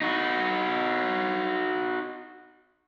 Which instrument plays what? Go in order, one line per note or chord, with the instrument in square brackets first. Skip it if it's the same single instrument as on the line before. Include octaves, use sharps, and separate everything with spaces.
[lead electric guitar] D#4 F#4